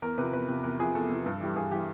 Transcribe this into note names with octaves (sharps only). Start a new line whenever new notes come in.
E2 A#4
C3 F3 B4
E2 B4
C3 F3
E2 A#4
C3 F3 G#4
E2 A4
C3 F3
G2
E3 G3
G2 G#4
E3 G3 G4